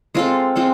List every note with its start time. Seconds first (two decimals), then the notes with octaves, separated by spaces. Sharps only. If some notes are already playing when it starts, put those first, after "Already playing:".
0.15 G#3 C4 F4 A4
0.56 G#3 C4 F4 A4